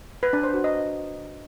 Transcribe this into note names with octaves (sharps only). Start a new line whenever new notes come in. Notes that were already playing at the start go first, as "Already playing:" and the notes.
B4
D4
C5
F#4
D#5